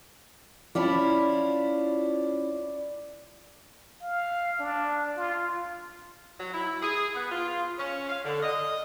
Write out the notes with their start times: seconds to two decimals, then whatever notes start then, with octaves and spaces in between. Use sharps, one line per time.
0.75 C#4 E4 F4 D5 A5 B5
4.02 F5
4.59 D4
5.17 F4
6.40 F#3
6.53 E4
6.81 G#4
7.14 B3
7.30 F4
7.77 C#4
8.09 F5
8.25 D3
8.43 D#5